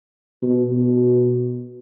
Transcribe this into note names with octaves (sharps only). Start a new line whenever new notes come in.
B2
B2